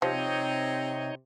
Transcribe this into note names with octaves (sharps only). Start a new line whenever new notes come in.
C3 F3 C4 D#4 C#5 D#5